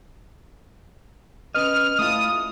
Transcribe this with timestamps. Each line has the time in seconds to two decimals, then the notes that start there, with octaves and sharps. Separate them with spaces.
1.55 C#4 B4 D#5 F6
1.99 A3 E4 F4 D#6